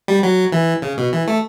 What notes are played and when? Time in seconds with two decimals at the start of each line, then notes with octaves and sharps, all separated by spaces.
0.08 G3
0.23 F#3
0.52 E3
0.82 C#3
0.98 B2
1.13 E3
1.27 A3